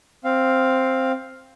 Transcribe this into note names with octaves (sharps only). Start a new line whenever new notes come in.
C4 F5